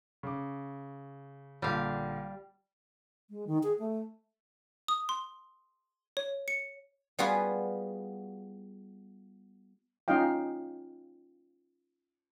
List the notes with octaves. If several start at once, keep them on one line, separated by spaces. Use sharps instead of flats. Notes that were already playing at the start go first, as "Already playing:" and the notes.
C#3 D6
A#1 D3 G3 F5
G#3
D#3
G#4
A3
D#6
C6
C#5
C#7
G3 B3 F4 F#4 G#4 B4
C#4 D#4 F4 D#5 F5 G5